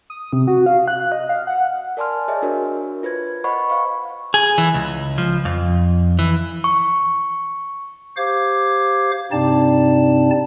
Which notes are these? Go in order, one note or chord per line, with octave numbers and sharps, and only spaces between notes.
D#6
C3
F#4
F5
F#6
D#5
F5
F#5
A#4 D5 G#5 A5 C6 F6
G#4 C#5 D#5 E5 G#5
D4 F#4 A#4 C#5
F4 B4 C5 G#6
C5 D#5 F#5 B5 C#6
C5 F5 C#6
G#4
E3
C#2
F3
F2
E3
C#6
G4 C5 F5 D6 G#6
G2 C3 C4 D#4 D5 A5